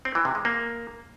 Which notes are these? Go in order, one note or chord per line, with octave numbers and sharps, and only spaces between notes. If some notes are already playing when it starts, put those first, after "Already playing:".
C4
E3
C3
G#3
A#3